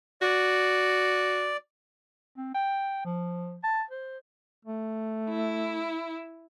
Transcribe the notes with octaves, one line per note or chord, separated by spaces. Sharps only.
F#4 D5
C4
G5
F3
A5
C5
A3
E4